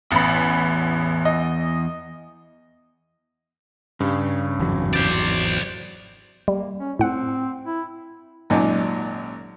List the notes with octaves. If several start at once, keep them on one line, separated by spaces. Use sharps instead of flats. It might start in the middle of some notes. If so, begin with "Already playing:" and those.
A1 E2 B5
D#5
G2 C#3
G#1 E2 F#3
C5 D5
G3 A#3
C#4
A2 C4 F#5
E4
G#1 F#2 A#2 D#4 G#5